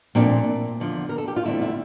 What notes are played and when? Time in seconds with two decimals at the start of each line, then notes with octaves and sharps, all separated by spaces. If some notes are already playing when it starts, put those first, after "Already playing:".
0.15 A#2 F3 A3 C4 D4
0.80 E2 D3 F3
1.09 A#4
1.18 A4
1.28 G4
1.36 F4
1.45 E2 D3 A3 C4 E4
1.62 E4